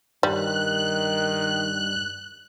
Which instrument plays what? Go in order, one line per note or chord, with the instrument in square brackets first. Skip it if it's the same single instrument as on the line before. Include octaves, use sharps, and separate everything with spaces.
[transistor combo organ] G2 [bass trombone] D#3 [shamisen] G3 [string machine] F#6